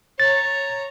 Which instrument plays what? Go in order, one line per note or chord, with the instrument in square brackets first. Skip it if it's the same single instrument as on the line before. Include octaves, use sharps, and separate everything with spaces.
[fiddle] C#5 A#5 [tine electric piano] A6